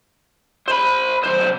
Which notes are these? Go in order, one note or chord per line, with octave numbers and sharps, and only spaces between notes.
C5 B5
B1 C5